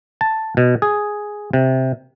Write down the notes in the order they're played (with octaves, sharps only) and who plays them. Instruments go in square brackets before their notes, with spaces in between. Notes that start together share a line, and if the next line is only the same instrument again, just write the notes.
[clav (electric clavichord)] A5
B2
G#4
C3